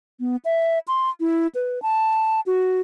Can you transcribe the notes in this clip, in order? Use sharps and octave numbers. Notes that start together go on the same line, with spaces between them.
B3
E5
C6
E4
B4
A5
F#4